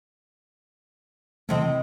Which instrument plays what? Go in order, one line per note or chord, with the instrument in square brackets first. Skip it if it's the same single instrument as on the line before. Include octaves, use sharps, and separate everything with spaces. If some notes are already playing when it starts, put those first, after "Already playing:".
[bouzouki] A2 C4 D#5 [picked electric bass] C3 E3 A3